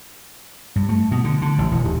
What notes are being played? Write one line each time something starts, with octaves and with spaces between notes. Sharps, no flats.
G2
A3
B2
D3
D3
A1
E1
D#1